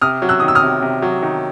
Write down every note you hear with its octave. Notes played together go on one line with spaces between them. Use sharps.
C3 D#6 F6
F#3
E6 F#6
D#3 D#6
E6
D#6 F6
C3
C3
F#3
D#3